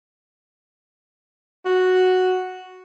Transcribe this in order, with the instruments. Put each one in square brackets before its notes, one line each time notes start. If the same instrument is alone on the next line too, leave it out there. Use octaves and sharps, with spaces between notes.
[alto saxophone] F#4